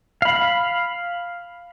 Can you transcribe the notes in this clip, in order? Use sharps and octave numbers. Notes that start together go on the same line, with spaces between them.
F5 B5